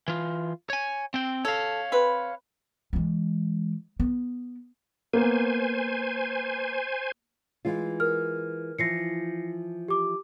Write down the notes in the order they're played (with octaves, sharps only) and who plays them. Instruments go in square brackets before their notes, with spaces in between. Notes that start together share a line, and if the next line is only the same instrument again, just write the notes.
[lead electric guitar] E3 F4
C#5 G#5
C4 G5
[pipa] A4 [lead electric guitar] C#5 F5
[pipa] C4 B4
[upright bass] E3 G#3
B3
[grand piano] A#3 B3 [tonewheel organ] C5 G#5
[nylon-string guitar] E3 G#3 F4
[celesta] A#4 F6
[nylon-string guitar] E3 F3 [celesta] A#6 C7 C#7
[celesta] G4 D6